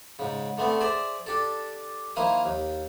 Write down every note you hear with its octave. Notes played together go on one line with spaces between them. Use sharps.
G#2 C#3
D3 A3 B3 C4
G#4 C5 D5 E5
D4 G4 A4
D#3 A#3 E4 C5 F5 D#6
D#2